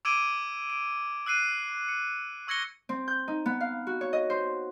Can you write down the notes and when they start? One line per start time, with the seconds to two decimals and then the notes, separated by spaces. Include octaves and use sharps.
0.05 D6 E6 G#6 D7 D#7 G7
0.70 D7
1.26 E6 F#6 C7 D#7
1.88 C#7
2.47 C#6 E6 G#6 A#6 C#7 G7
2.89 C4
3.08 G6
3.28 D#4
3.46 B3
3.60 F5
3.87 F#4
4.01 C#5
4.13 D#5
4.30 C5